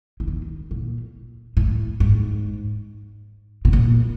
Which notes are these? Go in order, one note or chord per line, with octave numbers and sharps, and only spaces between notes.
E3
D#3
A#2
A2
G#2
B2
A#2